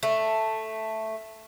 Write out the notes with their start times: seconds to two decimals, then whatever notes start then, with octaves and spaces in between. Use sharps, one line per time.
0.03 A3